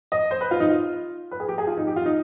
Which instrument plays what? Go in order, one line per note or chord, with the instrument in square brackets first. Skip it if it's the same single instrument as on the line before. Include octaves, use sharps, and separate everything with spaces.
[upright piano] D#5
C5
B4
F4
D#4
F4
B4
G#4
G4
G#4
F4
D#4
G4
F4
D#4